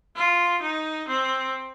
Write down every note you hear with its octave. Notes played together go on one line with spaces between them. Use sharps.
F4
D#4
C4